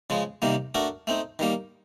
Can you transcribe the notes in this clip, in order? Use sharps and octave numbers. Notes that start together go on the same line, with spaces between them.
C#3 F3 G#3
C3 D#3 G3 A#3
A3 D4 F#4 A#4
A3 C4 D#4
D#3 G3 A#3